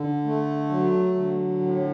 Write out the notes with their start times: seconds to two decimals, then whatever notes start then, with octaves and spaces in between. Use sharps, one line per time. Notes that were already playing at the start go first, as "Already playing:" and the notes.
Already playing: D3
0.25 A3
0.69 F#3
1.15 D3
1.60 A2